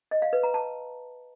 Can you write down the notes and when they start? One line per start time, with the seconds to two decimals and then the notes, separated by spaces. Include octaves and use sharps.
0.11 D#5
0.22 F5
0.33 B4
0.43 A#5
0.54 A5